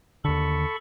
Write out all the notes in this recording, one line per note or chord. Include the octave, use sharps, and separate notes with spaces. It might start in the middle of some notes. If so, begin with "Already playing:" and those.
D#2 D3 A4 B5 C#6